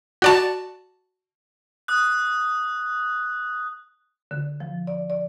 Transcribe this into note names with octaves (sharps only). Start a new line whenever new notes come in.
F#4 D5 A5
D#6 F#6
D3
F3
D5
D5